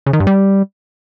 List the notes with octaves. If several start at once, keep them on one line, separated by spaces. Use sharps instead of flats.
C#3
D#3
G2
G3